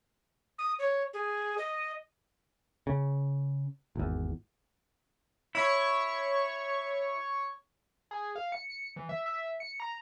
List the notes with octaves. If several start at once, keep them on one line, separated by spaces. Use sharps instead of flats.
D#6
C#5
G#4
D#5
C#3
G#1 E2
E4 C#5 C#6
G#4
F5
C#7
C#7
E3
E5
E5
C#7
A#5